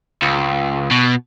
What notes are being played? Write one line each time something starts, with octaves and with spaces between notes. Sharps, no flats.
C#2
B2